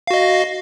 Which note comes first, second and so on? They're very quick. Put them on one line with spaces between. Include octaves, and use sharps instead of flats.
F5 F#4 D#5